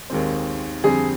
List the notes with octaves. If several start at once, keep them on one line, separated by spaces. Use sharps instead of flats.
D#2 D#3 G#3 C4
F2 D3 G3 C4 G#4